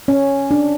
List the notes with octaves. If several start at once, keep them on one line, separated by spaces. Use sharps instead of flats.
C#4
D4